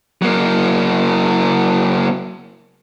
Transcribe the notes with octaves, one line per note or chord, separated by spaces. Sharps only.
F#3 A#3